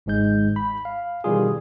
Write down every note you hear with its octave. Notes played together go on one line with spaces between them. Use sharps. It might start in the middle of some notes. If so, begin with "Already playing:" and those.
G#1 G#2 G#3 G6
B5
F5
B2 D#3 E3 G3 F4 G#4